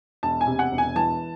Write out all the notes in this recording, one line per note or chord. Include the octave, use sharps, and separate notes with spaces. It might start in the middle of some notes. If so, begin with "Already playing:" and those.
E1 A5
G#5
C3
F#5
E1
G#5
E3 A5